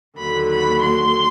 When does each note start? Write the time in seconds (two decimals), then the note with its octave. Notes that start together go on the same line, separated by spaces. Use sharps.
0.17 D#2 D3 F#3 B5
0.50 B5
0.81 C6